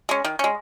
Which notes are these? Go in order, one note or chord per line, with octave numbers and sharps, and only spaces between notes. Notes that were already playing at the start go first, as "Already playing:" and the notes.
G#3 C#4
D#3
G#3 C#4